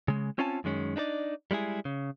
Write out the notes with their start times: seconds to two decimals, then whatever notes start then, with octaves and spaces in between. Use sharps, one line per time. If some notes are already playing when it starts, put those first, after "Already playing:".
0.08 C#3 G#3
0.38 C4 C#4 F4 C#5 G#5 A5
0.64 F#2 D#3 G#3 C#4
0.96 D4 D#4 A4 D5
1.51 G3 G#3 E4 G#4
1.85 C#3